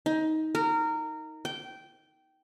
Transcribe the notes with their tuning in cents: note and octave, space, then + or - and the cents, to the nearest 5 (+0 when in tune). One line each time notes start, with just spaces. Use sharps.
D#4 +20
A#4 -20
G5 -15